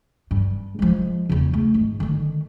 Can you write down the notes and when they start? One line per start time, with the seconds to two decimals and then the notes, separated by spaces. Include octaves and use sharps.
0.31 G2
0.79 F3 G#3
1.29 E2 C#3
1.54 A3
1.74 G#1
2.00 D3 D#3